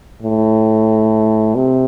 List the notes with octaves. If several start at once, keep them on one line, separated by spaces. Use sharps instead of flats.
A2
C3